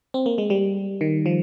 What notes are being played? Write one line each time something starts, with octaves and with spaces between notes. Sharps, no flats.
C4
A#3
G#3
G3
D#3
F3